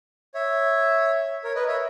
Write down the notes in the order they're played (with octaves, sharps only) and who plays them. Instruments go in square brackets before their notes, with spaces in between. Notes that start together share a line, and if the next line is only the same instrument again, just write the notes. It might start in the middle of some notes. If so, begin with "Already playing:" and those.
[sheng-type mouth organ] C#5 E5
A#4 C#5
B4 D#5
C#5 E5